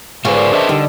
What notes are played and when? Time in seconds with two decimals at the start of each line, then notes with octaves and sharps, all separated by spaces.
0.25 G#2 D3 F4 G#4 B4 C5 F5 C#6
0.37 A#4 C6 D6
0.52 D4 G#4 C5 D#5 E5 A5
0.69 D3 G3 D#4